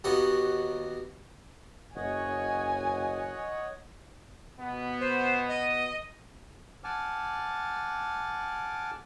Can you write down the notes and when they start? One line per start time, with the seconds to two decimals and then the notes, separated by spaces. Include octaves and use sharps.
0.04 D#2 B3 F#4 D#5
1.96 F#1 C#5 D#5 F#5 G#5
4.59 B2 B3
5.00 C5
5.49 D#5
6.84 F#5 G#5 A5 D6 F6